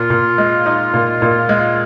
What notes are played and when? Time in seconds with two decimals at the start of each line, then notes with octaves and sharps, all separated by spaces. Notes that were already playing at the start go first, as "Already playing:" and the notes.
Already playing: A#2 F4
0.10 A#2
0.38 G#3
0.66 D#4
0.94 A#2
1.22 A#2
1.49 G#3